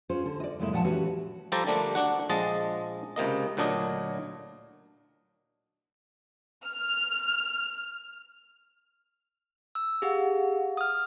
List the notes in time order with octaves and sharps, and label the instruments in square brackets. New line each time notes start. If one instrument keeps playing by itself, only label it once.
[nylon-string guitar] C#4 F4 G#4 C5
D3
D5 D#5
F#2 A2 C#3 G#3 A#3 E4
A#2 F3 G#3 C#4 F#5 A5
E3 C#4 F#4 G4 B4 C#5
[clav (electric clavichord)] F3 G3 A4 C5 D5 A#5
D3 F3 G3 A3 A#3 D4
D4 F#4 F#5
A#1 F3 G#3 D#5 A5
C#2 C3 A#3 D#5
D2 A#2 F#3 D4 D#5
[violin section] F6
[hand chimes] E6
[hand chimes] G4 G#4 [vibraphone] F5 F#5
[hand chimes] D#6 F6